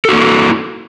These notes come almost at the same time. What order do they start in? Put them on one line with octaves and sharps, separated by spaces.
A4 F#4 A#3 E4